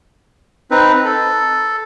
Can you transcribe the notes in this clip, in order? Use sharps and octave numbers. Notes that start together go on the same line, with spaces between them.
C4 D#4 B4
A4